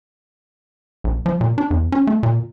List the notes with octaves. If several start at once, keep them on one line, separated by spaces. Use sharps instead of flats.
A#1
F3
A#2
D4
E2
C#4
A3
A#2